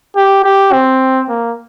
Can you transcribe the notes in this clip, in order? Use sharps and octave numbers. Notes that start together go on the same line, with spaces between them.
G4
G4
C4
A#3